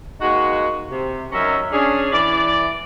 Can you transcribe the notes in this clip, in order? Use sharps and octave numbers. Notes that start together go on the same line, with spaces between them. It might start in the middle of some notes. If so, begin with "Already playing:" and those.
G#3 A#3 D#4 F#4
C3
F#2 D#3 F#3 C#4 E5 A#5
C#4 D4 G#4
E3 D5